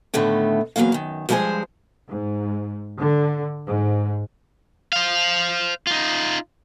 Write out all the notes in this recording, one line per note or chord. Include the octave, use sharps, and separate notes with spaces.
A2 D3 D#3 A3 B3
E2 D#3 F#3 A#3 F5
F#2 D#3
G2 F3 G#3 A4 C5 G#5
G#2
D3
G#2
C5 F5
D#4 F4